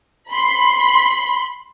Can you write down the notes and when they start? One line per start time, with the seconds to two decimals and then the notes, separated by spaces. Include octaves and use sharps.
0.31 B5 C6